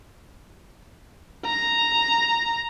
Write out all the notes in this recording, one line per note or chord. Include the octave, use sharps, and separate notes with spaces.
A#5